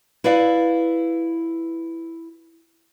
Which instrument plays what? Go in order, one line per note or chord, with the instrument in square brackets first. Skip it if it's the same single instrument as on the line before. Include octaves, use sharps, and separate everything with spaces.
[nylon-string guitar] E4 B4 D5 F5